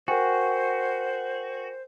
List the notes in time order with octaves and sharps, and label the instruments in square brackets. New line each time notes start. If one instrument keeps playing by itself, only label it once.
[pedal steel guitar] F#4 [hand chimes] A#4 G5 G#5 [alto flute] C5